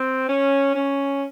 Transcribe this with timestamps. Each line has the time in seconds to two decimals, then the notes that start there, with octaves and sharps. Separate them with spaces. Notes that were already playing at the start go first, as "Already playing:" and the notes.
Already playing: C4
0.29 C#4
0.76 C#4